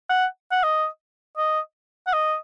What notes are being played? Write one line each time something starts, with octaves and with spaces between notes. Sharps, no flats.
F#5
F#5
D#5
D#5
F#5
D#5